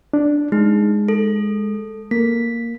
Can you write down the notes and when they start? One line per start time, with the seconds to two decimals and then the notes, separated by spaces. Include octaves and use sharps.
0.14 D4
0.52 G#3 D#4
1.09 A4
2.11 A#3 B6